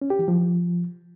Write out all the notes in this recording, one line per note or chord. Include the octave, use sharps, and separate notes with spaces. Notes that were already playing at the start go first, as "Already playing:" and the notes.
C#4
G4
E3
F3